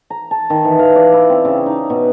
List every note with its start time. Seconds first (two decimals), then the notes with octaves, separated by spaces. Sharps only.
0.10 A#5
0.31 A5
0.50 D#3
0.65 E3
0.79 F5
0.96 D5
1.13 E4
1.30 C4
1.45 C#3
1.66 D#4
1.90 B2